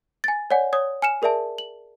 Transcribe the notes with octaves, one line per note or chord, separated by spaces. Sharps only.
G#5 A6
C#5 D5 F#5 G#5
C#5 D#6 G#6
G#5 F6 C#7 E7
G#4 A#4 D5 E5 A5
F#7